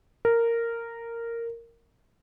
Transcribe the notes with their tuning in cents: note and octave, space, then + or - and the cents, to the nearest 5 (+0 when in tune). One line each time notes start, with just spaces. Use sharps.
A#4 -10